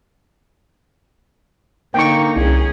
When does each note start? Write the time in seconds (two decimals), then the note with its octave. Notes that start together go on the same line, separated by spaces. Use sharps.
1.94 D3 A#3 D#4 G5 C#6
2.36 C2 C#4 G#4